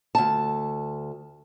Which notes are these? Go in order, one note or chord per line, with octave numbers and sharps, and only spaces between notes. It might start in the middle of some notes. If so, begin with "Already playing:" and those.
D2 A5